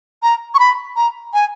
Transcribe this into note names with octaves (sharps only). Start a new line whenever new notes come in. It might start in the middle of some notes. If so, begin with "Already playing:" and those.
A#5
C#6
B5
A#5
G#5